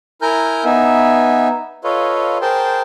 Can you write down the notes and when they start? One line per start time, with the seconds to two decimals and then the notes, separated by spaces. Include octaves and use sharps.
0.22 E4 A#4 G#5 A#5 F6 G6
0.64 B3 D#4 E5 G#5
1.84 F4 A4 B4 C#5 D#5 F5
2.41 G#4 A#4 C5 G5 A5 C6